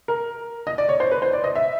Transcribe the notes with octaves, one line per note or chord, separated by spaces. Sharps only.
A#4
D#5
D5
C#5
C5
B4
C5
D5
D#5
E5